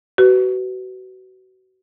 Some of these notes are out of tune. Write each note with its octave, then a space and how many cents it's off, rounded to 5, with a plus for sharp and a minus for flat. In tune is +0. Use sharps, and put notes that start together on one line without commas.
F#4 +30 B4 +15